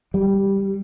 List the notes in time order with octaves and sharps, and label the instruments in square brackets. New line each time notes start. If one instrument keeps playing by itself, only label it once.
[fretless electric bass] G3